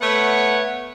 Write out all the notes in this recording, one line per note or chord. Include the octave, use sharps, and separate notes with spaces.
A3 B3 C#5 F#5